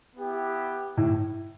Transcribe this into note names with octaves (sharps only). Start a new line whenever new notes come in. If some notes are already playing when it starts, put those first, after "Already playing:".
B3 E4 G4
A2